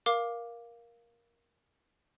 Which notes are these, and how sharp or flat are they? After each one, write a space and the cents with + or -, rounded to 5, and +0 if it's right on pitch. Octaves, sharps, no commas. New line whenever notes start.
A#4 +15 F5 +0 D6 +0